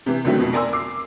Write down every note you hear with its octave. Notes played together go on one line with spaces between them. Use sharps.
C3 E3
C#2 D3 D#3 F#3 A3 C4
F2 B2
A#4 D5 G#5 A#5 C6 E6
D6 C7